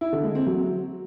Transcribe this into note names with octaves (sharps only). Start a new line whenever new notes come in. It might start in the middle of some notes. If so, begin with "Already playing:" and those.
E4
D3
G#3
C4
F#3